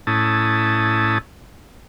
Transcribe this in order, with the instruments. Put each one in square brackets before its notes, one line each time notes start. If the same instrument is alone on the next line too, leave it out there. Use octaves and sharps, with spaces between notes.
[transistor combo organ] A2 C#4 E4 A5 D#6